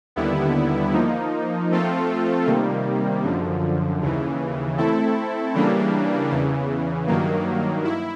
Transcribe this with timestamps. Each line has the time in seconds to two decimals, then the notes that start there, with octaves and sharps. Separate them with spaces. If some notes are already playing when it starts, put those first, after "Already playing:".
0.16 D#2 D3 G3 B3 E4
0.94 F3 A#3 D#4
1.71 F3 A3 C4 F4 A4
2.47 C3 D#3 G3 A#3
3.23 F#2 D3 F3
4.01 D#2 C#3 E3
4.77 A3 C4 E4 A4
5.54 C#3 E3 G3 A#3 D4
6.31 E2 C#3 E3
7.07 G2 D#3 F#3 A#3
7.85 E4